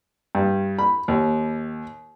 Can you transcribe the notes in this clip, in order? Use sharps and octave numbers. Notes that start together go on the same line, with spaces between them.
G2
B5
D#2